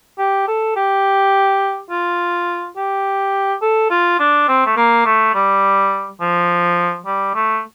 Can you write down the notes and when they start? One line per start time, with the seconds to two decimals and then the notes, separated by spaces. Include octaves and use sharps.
0.18 G4
0.48 A4
0.76 G4
1.90 F4
2.76 G4
3.62 A4
3.90 F4
4.19 D4
4.48 C4
4.66 A3
4.77 A#3
5.05 A3
5.35 G3
6.20 F3
7.06 G3
7.35 A3